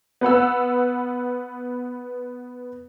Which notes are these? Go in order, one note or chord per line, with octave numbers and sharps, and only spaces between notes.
B3 B4 F#5 E6